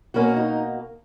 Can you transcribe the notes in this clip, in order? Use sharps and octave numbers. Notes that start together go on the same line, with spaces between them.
B2 A#3 C#4 F#4
D#4